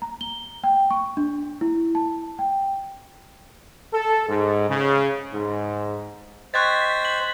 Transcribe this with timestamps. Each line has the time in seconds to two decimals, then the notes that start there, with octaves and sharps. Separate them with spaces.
0.02 A#5
0.21 G7
0.64 G5
0.91 C#6
1.17 D4
1.61 E4
1.95 A5
2.39 G5
3.94 A4
4.29 G#2
4.69 C#3
5.32 G#2
6.54 C5 D#5 G5 C#6 F#6 G#6 A6 B6
7.05 F#7